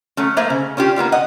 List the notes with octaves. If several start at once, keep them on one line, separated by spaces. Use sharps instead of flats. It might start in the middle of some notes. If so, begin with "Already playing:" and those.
F#3 A3 C#4
A3 A#3 C5 E5 F5
C#3
C#4 D4 F4 G4
A#3 B3 D4 F4
D#5 F#5